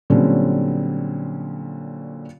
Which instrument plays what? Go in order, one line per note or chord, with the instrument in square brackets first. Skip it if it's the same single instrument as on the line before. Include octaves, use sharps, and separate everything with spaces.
[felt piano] A#2 D3 F#3 G3 C4 C#4